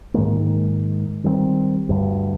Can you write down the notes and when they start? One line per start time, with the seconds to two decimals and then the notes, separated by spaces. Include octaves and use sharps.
0.14 G#2 D#3 G#3 A#3
1.24 D#3 G3 A3 C4
1.89 D2 G2